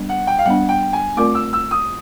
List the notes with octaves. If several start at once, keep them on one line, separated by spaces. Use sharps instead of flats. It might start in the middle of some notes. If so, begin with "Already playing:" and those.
Already playing: G3 B3 D4
F#5
G5
F5
G3 B3 D4 F#5
G5
G#5
A3 C4 F4 A#4 D5 D6
E6
E6
D#6